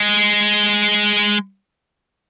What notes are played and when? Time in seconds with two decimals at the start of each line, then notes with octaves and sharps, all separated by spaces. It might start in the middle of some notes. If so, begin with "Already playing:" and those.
Already playing: G#3